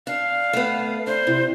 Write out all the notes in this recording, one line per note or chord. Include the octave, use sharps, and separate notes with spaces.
D4 F5
A3 B3
D4 C5
C3 E4